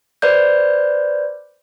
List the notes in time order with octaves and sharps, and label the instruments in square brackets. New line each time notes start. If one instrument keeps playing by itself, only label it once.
[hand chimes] B4 C5 D5 G6